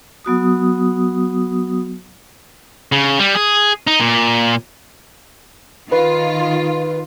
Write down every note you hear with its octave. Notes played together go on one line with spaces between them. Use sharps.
F#3 B3 F#4 D#6
C#3
G3
G#4
D#4
A#2
D#3 F4 B4